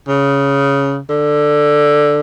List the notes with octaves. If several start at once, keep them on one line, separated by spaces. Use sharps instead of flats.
C#3
D3